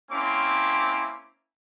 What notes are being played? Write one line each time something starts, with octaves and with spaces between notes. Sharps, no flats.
A#3 C4 C#4 E4 C6 D6